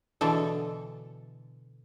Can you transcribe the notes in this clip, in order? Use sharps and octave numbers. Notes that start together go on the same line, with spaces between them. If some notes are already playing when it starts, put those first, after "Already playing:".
B2 D3 E3 A4